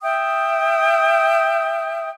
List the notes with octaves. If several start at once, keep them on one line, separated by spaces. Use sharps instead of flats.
E5 G5 D#6